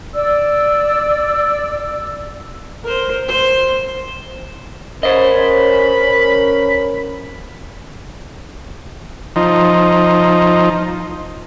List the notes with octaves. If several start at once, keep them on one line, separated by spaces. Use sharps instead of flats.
D5 E6
A#4 C5
C5
C#4 A#4 C5 D#5 B5
F3 D#4